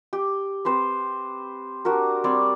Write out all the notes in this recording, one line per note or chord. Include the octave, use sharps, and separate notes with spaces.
G4
C4 B4 C5
D4 F#4 G4 A#4
G3 C4 C#5 D5